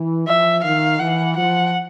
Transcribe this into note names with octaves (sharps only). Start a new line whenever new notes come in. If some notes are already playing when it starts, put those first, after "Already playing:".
Already playing: E3
F3 E5
D#3 F5
E3 F#5
F3 F#5